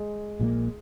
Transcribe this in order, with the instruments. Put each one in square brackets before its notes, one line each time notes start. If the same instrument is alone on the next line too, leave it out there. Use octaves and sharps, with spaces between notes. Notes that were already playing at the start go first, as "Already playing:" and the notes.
Already playing: [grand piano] G#3
[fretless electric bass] A#1 A#2 F3 A#3